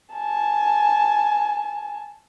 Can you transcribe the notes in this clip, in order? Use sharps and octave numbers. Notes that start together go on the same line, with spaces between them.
G#5 A5